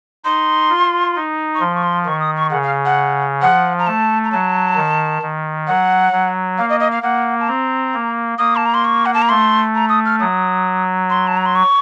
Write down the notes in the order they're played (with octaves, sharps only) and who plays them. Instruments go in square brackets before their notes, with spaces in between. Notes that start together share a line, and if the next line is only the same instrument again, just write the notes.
[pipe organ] D#4 [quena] C6
[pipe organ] F4
D#4
[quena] C#6
[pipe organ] F3 [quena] C6
[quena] C#6
C6
[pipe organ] D#3 [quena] C#6
[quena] D#6
C#6
[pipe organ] C#3 [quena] F#5
[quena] F5
F#5
[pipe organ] F3 [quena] F#5
[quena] A#5
[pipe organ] A3 [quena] A5
[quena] A#5
[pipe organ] F#3 [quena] A5
[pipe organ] D#3
D#3
[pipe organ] F#3 [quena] F#5
[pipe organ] F#3
[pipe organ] A#3 [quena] F5
[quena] D#5
D#5
F5
[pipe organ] A#3 [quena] F#5
[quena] A5
[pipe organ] C4 [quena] A#5
[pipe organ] A#3
[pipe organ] A#3 [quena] D#6
[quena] A5
A#5
C6
C#6
F#5
A5
A#5
[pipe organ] A3 [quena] C6
[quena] A#5
D#6
F6
[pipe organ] F#3 [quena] D#6
[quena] C6
A5
A#5
C6
C#6